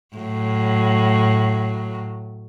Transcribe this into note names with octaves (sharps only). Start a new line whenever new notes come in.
A2 F#3